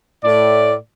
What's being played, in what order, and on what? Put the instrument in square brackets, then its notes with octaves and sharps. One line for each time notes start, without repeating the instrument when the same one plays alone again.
[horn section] A2 D5